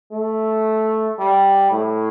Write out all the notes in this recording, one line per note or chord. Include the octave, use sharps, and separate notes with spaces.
A3
G3
A2